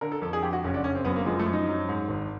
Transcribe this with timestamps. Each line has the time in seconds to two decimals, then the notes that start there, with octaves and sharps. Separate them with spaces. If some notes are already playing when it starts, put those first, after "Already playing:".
0.01 D3 A#4
0.12 A4
0.22 F2 A4
0.33 G#4
0.42 F2 G4
0.53 F#4
0.64 F#1 C#4
0.74 D4
0.84 F#1 C#4
0.95 C4
1.05 F#2 B3
1.16 A#3
1.26 F3 G#3
1.39 A3
1.46 F#2
1.53 D#4
1.68 F#3
1.89 G#2
2.08 G#1